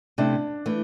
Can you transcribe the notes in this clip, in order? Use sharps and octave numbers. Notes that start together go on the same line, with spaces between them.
C3 A3 D4 E4
E3 A3